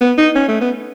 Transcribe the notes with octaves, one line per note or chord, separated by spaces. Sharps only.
B3
D#4
C#4
A3
B3